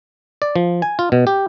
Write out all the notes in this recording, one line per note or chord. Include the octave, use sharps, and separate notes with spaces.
D5
F3
G#5
F4
B2
G4